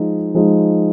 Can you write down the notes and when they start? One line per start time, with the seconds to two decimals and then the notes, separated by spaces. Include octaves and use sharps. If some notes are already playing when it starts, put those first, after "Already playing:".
Already playing: F3 G#3 D#4
0.34 F3 G#3 D#4